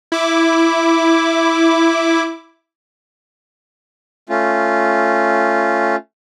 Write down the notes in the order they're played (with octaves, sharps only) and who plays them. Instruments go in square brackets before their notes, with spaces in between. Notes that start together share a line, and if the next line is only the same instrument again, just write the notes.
[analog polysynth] E4 D6
[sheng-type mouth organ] A3 C#4 F4